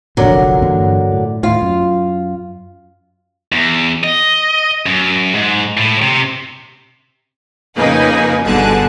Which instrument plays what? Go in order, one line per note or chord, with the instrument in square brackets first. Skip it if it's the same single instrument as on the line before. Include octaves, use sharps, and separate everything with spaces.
[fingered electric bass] F1 A#1 F3 [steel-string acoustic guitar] D3 F#3 A#4
[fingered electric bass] G2 E3 A#3
A2
[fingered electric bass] D#2 A2 [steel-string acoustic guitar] F4 F5
[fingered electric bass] F#2
[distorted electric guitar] E2
D#5
F#2
G#2
A2
C3
[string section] F2 C#3 A#3 D#4 B4 G#5
G1 B2 D3 G#4 A5 F#6